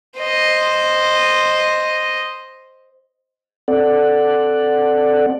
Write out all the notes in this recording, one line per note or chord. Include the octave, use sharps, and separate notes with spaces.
C5 D#5
C4 A4 D5 F#5